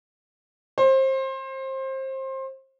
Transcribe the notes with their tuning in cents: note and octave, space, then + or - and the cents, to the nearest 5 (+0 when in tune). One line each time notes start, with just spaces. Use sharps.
C5 +25